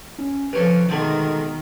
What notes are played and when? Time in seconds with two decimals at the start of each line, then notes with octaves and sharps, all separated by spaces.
0.18 C#4
0.53 C3 F3 C#4 A4 B4
0.89 B2 D3 D#3 G#3 A3